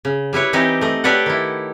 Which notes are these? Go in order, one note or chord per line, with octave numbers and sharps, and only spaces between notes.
C#3
G3 E4 B4 C#5
E3 C4 D#4 G4 D#5
A3 D#5
G4 A4 B4 C#5 D5 F#5
D#3 E4